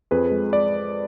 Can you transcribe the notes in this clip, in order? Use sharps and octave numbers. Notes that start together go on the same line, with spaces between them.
F2 G#4 B4
G#3
D5